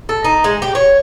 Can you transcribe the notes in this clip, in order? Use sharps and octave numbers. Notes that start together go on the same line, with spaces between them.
A4
D#4
G#3
G4
C#5